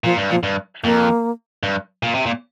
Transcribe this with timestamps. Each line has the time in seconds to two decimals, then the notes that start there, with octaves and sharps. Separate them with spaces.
0.04 A#2 F3
0.17 G2
0.30 A#2 F3
0.43 G2
0.84 F2 A#3
1.63 G2
2.03 A#2
2.14 C3
2.26 A#2